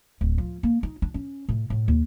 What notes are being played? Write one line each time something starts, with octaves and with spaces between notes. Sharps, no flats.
D1
F3
A#3
D#4
D4
C#4
A2
A2
D#2